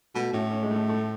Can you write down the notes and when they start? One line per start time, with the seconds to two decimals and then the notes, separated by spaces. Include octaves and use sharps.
0.15 B2 A3
0.33 A2 C#4
0.51 C#4
0.63 G#3
0.71 A3
0.89 A3